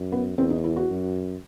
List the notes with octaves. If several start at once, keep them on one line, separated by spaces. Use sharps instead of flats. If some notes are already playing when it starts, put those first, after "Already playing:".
Already playing: F#2
B3
E2 C4
D#4
E4
F#4
F#2